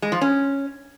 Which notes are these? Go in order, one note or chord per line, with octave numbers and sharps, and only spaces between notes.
G#3
F3
C#4